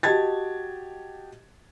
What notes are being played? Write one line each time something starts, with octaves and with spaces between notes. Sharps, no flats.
F#4 G4 D#5 A5 G#6 A6